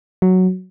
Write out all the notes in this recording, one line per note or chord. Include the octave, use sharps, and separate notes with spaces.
F#3